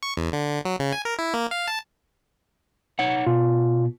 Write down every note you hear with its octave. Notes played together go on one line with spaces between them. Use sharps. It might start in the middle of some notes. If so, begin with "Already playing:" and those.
C#6
E2
D3
F#3
C#3
G#5
A#4
E4
A#3
F5
A5
D#4 C#5 F#5
B2 F4